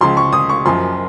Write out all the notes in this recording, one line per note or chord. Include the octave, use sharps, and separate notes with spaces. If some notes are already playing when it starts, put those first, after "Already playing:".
C#2 C#3 F3 C6
C#6
D#6
C#6
F#1 F#2 F3 C6